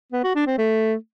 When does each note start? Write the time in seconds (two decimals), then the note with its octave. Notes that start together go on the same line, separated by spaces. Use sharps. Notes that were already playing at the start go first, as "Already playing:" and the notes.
0.12 B3
0.24 F#4
0.35 D4
0.47 C4
0.58 A3